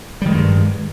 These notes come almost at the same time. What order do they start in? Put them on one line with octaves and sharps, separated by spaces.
G3 D#3 G#3 G2